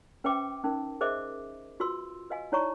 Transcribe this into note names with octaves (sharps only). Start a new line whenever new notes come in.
C#4 B4 C5 E5 G5 D6
C#4 D#4 A#4
G#4 A#4 C5 D#5 E5 D6
F4 F#4 B4 C6 E6
B4 D#5 F5 G#5
D#4 E4 C#5 D5 A#5 C#6